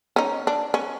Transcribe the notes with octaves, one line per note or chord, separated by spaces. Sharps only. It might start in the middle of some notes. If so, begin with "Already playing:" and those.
C#4 D#4
D4
C#4